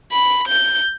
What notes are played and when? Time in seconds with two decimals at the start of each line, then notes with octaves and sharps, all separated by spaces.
0.12 B5
0.48 G6